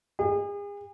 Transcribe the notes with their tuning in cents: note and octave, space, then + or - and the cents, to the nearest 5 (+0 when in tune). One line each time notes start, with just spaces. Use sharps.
G#4 -40